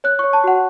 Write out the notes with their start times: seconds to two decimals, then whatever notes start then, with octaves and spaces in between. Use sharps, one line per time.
0.04 C#5 F#6
0.19 C#5 C#6
0.33 A5
0.44 F#4 F#5